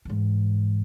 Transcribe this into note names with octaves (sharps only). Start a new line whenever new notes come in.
G#2 E3